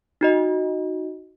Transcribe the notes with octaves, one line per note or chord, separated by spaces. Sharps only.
D#4 F#4 D#5